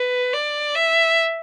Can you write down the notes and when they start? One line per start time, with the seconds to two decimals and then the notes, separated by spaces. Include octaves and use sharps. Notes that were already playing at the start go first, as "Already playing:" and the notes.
Already playing: B4
0.33 D5
0.75 E5